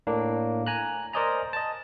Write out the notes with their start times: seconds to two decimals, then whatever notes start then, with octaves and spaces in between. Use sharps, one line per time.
0.07 A2 A#3 D4
0.67 G#5 A#5 F#6
1.13 A#4 C5 D5 D#5 G#5 A#5
1.53 D#5 A5